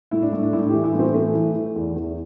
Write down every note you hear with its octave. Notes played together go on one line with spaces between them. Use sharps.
A2 E4
D4
A2
D4
A2 E4
G4
E3
E4
A2 C4
E3 A3
E3
E3
E2
E2